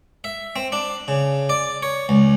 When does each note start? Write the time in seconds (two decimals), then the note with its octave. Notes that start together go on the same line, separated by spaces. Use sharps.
0.24 E5
0.56 C4
0.72 D4
1.08 C#3
1.49 D5
1.83 C#5
2.09 C#2